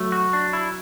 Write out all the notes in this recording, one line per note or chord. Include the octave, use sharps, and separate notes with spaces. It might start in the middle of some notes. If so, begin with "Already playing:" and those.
Already playing: F#3 A3
F#4
D4
E4